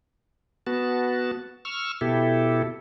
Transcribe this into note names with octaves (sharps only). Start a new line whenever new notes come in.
B3 F#4 A5
C#6 E6 F6
B2 E4 G4 A4